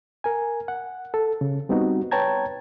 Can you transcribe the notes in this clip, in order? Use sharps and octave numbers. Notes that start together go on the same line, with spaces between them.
A#4 G#5
F#5
A4
C#3
G3 B3 C4 D#4 F#4
B4 C#5 G5 A5 A#5 G#6